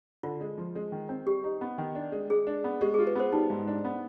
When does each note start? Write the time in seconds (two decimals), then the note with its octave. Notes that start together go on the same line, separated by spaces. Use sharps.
0.23 D3 F4
0.41 G#3
0.58 F3
0.75 G#3
0.92 D#3
1.09 C4
1.26 G3 G4
1.44 D#4
1.61 B3
1.78 D#3
1.95 D4
2.12 G#3
2.30 G#3 G#4
2.47 D4
2.64 B3
2.81 G#3 G4
2.94 G#4
2.99 F4
3.07 B4
3.15 B3 C5
3.32 G3 D#4
3.50 G#2
3.68 D4
3.84 B3